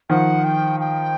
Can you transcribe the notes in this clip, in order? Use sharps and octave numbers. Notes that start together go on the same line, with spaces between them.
D#3 F3 F#5
G5
G5